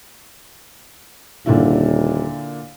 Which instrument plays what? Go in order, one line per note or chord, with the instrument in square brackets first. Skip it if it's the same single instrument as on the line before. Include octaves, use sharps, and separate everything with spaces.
[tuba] D#1 [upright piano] A#2 D3 E4